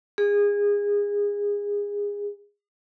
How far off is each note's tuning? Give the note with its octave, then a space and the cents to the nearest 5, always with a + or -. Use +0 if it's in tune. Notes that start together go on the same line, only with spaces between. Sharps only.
G#4 -25